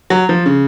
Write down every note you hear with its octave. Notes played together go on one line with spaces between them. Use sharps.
F#3
F3
C#3